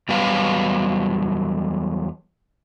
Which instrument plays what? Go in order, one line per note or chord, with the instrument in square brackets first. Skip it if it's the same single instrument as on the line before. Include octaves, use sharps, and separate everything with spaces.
[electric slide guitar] E2 F#3 G3 B3 B4 F5